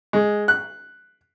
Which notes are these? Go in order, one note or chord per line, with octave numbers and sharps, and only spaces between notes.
G#3
F#6